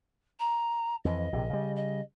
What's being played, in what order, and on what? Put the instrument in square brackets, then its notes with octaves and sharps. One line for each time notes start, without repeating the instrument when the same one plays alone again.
[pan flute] A#5
[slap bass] F2 E3 [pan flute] D#5
[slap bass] A#1 C3
C#3 G3
[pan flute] D#5